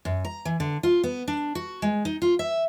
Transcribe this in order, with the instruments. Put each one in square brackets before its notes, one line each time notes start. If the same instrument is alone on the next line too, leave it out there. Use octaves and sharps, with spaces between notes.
[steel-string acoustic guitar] F#2
A#5
E3
D3
F4
B3
D4
F#4
G#3
D#4
F4
E5